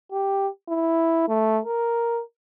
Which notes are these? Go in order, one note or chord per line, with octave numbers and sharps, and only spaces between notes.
G4
E4
A3
A#4